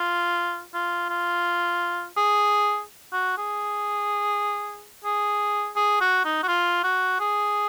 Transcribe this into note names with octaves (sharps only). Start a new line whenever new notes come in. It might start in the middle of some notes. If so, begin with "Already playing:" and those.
Already playing: F4
F4
F4
G#4
F#4
G#4
G#4
G#4
F#4
D#4
F#4
F4
F#4
G#4